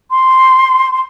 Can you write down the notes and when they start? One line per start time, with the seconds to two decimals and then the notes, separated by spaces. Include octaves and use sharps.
0.11 C6
0.93 C6